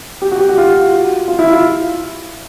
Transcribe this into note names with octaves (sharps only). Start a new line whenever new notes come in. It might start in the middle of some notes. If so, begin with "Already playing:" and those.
G4
F#4
G4
F#4
F4
F4
E4
F4